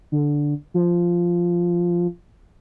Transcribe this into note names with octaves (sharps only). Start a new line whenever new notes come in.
D3
F3